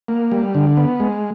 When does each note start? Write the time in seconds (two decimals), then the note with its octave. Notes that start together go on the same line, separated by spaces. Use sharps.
0.08 A#3
0.32 G3
0.55 D3
0.77 B3
1.00 G#3